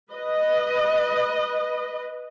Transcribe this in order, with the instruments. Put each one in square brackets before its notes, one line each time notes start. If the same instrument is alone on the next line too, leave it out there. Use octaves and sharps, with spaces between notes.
[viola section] B4 D#5